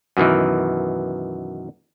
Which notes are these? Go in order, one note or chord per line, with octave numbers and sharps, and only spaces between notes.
F#2 B2 D#3 E3